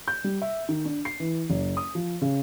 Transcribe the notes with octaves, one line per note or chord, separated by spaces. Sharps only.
G6
G3
E5
D#3
D4
C7
E3
F#1
D#6
F3
C#3